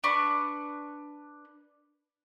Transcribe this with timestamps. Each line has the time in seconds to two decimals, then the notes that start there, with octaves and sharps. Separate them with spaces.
0.04 D4 B4 C#6